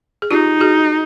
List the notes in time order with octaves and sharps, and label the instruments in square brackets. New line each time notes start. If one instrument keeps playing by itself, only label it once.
[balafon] G#4
[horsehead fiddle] D#4 [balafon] F4 G4
[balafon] F#4 G#4